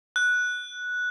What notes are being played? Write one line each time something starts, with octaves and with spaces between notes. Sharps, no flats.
F#6